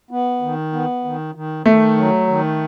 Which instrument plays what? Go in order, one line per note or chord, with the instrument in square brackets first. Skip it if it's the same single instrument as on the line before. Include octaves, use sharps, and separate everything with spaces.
[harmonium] B3
D#3
B3
D#3
D#3
[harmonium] D#3 [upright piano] A3
[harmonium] F#3
D#3